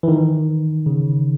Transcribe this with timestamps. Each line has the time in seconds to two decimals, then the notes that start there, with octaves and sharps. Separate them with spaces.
0.03 E3
0.08 D#3
0.86 C#3